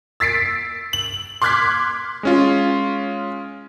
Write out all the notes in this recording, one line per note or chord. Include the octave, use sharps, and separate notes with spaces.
E6 A6 B6 C7 D7
F#7
C6 D6 F6 F#6 G#6 B6
G#3 C#4 F4